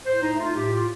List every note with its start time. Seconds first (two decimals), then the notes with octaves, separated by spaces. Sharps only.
0.05 A2 C5
0.22 D#4
0.31 A3
0.39 F4
0.56 A2 G4
0.73 F4